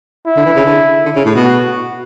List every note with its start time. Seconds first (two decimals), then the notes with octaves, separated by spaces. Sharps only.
0.27 E4
0.36 D3
0.46 E3
0.56 C#3
0.65 D3
1.05 D3
1.15 C#3
1.25 A2
1.35 B2
1.44 F#4